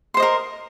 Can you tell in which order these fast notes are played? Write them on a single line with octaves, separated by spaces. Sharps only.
C6 C5 D#5 A#4